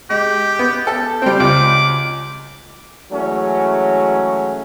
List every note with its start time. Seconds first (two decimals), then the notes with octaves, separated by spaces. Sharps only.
0.10 G#3 G4
0.59 B3
0.87 A4
1.22 G3 C4 G5
1.40 C#2 D6
3.12 E3 F#3 G#3 A3 C#4